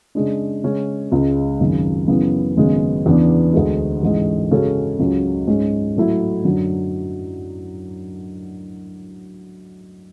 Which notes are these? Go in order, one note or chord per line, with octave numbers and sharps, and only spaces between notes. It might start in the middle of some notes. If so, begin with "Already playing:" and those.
C#3 G#3 D4
C#3 G#3 C#4
C#2 C#3 G#3
G#1 F#2 C#3
F#2 C#3 E3 B3
G#1 F#2 C#3 G#3 B3
E2 C#3 E3 B3 D4
D2 D3 G#3
A1 G#2 G#3
C#3 G#3 C#4 F#4 A4
C#2 C#3 F#3 C#4
G#2 G#3 C#4
A2 F#3 A3 E4
F#2 D3 F#3